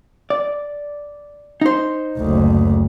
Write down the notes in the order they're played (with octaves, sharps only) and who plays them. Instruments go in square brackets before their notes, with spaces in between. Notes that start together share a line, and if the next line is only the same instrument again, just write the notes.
[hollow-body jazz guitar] D5
D#4 C5
[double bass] F#1 D2